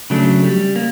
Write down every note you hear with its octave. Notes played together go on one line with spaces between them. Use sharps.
C#3 F#3 A3 D4
G3
A#3